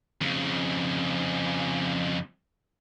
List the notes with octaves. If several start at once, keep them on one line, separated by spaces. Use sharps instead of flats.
F2 C#3